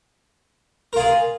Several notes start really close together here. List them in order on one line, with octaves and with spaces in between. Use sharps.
A#4 F4 G#4